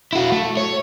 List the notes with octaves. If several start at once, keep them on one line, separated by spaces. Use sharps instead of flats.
E4 F#4
A3
C#5